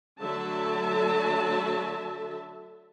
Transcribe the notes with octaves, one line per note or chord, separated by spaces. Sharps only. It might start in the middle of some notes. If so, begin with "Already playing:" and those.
D3 F#3 A3 E5 A5